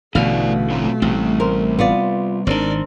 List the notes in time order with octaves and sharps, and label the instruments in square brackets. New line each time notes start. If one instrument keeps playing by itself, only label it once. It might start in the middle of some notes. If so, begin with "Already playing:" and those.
[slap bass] A1 D3 E3 [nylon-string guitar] B2 F5 [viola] A3 [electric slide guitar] E4 D5
[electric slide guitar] F#3 C4 F4
[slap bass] A1 [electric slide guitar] G3 C4
[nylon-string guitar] A#4 C5
B3 F4 D5
[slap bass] G#1 B2 D#3 [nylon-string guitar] C4 D4 [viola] A#4 D5